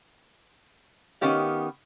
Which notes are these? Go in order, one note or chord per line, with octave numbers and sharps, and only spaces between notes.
D#3 B3 C#4 G4 F5